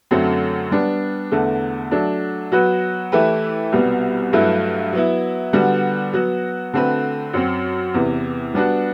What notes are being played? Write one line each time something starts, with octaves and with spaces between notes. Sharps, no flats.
F#2 D3 F#3 A3 C4
G3 B3 D4
E2 D3 A3
F#3 A3 D4
F#3 B3 F#4 B4
E3 A3 E4 G4 B4
C2 B2 G3 B3
G2 F#3 A3 E4 B4
F#3 B3 E4
D3 G3 B3 F#4
F#3 B3 F#4
D3 A3 C4 F#4 B4
F#2 F#3 C4
E2 C3 E3
G3 B3 D4 F#4